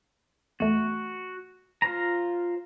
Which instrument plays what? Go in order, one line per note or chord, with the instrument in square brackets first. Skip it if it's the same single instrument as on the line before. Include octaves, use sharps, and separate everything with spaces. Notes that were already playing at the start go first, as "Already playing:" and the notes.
[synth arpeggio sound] E2 A3 [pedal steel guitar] F#4
[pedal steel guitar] F4 C5 A#5